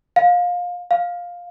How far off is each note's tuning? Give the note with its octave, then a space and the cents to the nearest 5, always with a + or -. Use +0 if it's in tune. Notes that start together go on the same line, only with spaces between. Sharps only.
F5 +25
F5 +10